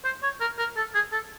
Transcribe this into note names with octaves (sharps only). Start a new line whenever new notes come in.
C5
C#5
A#4
A#4
A4
G#4
A4